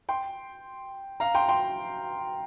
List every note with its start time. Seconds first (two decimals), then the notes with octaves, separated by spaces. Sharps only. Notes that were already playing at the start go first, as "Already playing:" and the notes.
0.09 G5 C6
1.20 F5 A#5
1.35 G5 C6
1.48 G5 C6